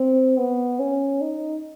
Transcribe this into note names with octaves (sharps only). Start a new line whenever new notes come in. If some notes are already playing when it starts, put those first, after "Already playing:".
Already playing: C4
B3
C#4
D#4